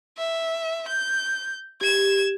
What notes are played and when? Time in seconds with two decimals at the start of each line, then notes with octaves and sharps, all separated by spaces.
0.18 E5
0.89 G6
1.81 G4 G#6 E7